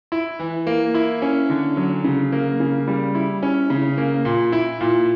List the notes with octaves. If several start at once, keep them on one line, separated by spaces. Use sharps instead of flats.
E4
E3
A#3
E4
C#4
D3
F#3
C#3
A#3
C#3
G3
E4
C#4
C#3
A#3
A#2
E4
A#2